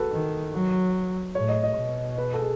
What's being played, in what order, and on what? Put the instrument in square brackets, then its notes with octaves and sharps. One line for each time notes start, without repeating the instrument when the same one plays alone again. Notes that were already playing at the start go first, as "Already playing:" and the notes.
Already playing: [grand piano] F#4 A4 B4
[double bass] D#3
F#3
[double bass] A2 [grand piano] C#5
[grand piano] D#5
D#5
[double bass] B2
[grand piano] B4
A4
G#4